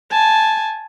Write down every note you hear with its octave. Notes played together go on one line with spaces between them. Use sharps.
G#5 A5